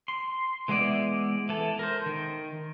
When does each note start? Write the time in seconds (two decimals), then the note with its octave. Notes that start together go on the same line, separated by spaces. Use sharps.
0.08 C6
0.68 E3 G#3 B3 E4 D5
1.49 E3 A4
1.79 A#4 C5
2.06 D#3